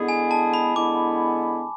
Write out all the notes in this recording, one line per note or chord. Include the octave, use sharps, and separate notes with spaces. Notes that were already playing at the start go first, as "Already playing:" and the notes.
Already playing: D3 G#3 B3 E4 G#4
G#5
A5
B5
D3 G#3 B3 E4 D6